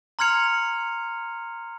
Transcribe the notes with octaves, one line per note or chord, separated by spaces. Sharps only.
A#5 C6 F6 G#6 C#7 F7